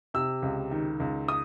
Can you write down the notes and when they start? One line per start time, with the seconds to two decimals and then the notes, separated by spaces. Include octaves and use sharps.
0.14 C3 E6
0.42 C#2
0.71 D#3
1.00 C#2
1.28 D#6